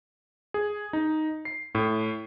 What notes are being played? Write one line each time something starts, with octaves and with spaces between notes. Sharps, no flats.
G#4
D#4
C7
A2